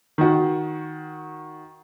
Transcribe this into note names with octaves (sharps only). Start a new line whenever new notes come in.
D#3 F#4